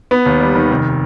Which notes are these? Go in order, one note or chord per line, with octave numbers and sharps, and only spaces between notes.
B3
D#2
G3
D#3
F1